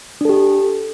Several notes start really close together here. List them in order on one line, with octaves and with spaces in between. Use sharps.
D4 A4 G4